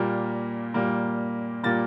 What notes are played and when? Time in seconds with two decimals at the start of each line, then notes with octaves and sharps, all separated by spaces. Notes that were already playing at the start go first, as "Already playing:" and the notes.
Already playing: A#2 G3 A#3
0.74 A#2 G3 A#3
1.63 A#2 G3 A#3 A6